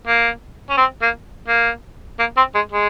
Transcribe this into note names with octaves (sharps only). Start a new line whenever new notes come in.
A#3
C#4
C4
A#3
A#3
A#3
C4
G#3
G#3